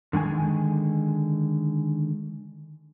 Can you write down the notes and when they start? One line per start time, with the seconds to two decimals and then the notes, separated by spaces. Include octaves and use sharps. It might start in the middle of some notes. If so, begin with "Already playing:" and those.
0.13 D3 D#3 G#3 G#5